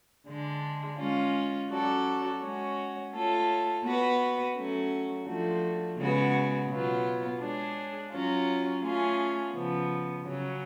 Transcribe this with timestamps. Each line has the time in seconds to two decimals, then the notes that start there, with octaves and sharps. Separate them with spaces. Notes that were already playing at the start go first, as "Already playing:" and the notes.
0.27 D3 G#3 D4
0.98 G#3 C#4 F4
1.69 F#3 C#4 F#4 A4 D5
2.41 G#3 C#4 F#4 C#5
3.12 A3 F4 A4 C#5
3.84 B3 F#4 B4
4.55 F#3 A3 C#4 F#4
5.25 F3 A3 D4 F#4
5.97 C#3 G#3 B3 F#4
6.67 B2 F#3 B3 F4
7.39 G#3 D4 G#4 C#5
8.11 F#3 C#4 F4
8.81 A3 C#4 F4 G#4
9.52 C#3 F3 B3
10.24 C#3 F#3 C#4